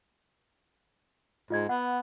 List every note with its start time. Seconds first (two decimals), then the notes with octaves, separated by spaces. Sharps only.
1.50 G#2 F4 D#5 G#6
1.69 B3 F#5